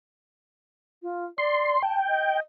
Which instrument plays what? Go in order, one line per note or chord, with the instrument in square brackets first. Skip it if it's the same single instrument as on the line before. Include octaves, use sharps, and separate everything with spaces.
[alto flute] F4
[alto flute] D5 [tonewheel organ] C6
[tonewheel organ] G5 [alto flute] A5
[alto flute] D#5